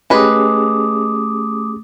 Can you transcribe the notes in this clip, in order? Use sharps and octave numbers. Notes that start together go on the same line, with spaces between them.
G#3 A3 C#4 G4 G#4 B4 D6 D#6